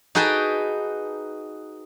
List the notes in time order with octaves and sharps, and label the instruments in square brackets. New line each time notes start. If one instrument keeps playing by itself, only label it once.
[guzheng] D#4 F#4 G#4 B4 G5 A5